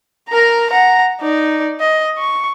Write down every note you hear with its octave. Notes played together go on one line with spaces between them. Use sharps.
A#4 A#5
F#5 A#5
D#4 D5
D#5
C#6